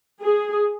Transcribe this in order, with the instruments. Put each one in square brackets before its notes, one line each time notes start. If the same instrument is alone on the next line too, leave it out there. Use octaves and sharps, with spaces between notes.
[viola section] G#4